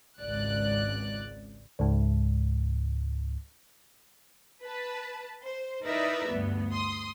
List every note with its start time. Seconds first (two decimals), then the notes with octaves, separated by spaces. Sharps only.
0.21 G#1 C#2 D5 F#6
1.79 C#2 G#2
4.61 B4 A5
5.44 C5
5.85 D#4 E4 A#4 B4 D5 E5
6.30 D2 G2 B3
6.72 C6 D#6